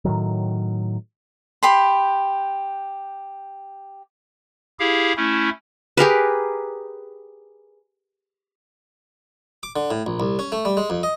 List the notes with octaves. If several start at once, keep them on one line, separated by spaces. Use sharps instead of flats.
A2 D#3 F#3
G4 B5 C6
E4 G4 G#4 F5
A3 C#4 E4
G4 G#4 A#4 B4
D6
D3
A2
A#1
C2
C#4
A3
G3
G#3
F2
D#5